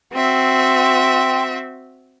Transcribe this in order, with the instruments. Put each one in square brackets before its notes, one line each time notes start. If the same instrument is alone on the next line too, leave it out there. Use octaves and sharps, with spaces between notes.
[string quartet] C4 F#4 E5 [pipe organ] G5 C6